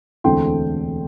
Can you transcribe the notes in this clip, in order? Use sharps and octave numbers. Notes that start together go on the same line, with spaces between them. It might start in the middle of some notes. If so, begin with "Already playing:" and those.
E1 D2 D3 A3 C4 G5 C6